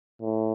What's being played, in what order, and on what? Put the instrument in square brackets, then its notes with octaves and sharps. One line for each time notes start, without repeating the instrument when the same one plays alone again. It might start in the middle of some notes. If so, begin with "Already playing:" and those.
[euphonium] A2